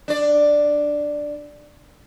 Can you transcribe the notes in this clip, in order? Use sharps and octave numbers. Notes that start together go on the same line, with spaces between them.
D4 D5